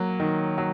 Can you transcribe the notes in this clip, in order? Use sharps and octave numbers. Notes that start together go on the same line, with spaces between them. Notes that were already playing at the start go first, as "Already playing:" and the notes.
Already playing: F#3 A#3
D#3
F#3